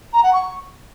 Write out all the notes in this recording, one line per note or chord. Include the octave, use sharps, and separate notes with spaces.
A#5
F#5
C#6